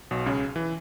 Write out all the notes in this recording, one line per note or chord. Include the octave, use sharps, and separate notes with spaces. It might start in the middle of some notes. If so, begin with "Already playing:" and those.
B1 B2
C#2 C#3
E3